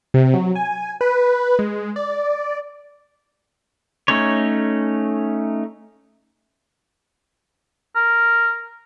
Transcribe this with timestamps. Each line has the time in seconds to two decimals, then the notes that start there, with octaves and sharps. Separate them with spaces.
0.14 C3
0.34 F#3
0.55 G#5
1.01 B4
1.59 G#3
1.96 D5
4.08 A3 C#4 D#4 C#5
7.95 A#4